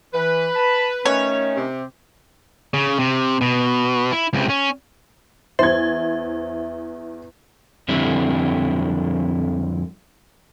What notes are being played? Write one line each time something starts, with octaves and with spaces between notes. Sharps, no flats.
E3 B4
A5 B5
D#3 A3 C#4 C#5
C3 C4 G4
C#3
C3
B2
E4
C#2 C3
C#4
E2 C5 E5 G#6
F2 D3 G3 C4 D4 E4